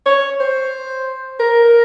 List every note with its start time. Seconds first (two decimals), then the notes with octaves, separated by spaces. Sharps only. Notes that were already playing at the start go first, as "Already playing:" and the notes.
0.06 C#5
0.40 C5
1.40 A#4